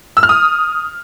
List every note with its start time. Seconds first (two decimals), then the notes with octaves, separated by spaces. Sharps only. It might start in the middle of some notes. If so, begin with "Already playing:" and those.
0.17 E6
0.23 F6
0.29 D#6